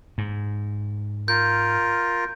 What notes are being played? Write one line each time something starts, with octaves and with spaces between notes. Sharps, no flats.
G#2
F4 A#4 G6